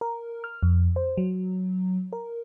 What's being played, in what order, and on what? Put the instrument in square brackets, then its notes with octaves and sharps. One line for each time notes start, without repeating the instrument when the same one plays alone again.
[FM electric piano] A#4
F6
F2
C5
F#3
A#4